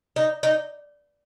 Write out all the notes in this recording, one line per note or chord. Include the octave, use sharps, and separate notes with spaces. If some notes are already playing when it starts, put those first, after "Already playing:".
D#4
D#4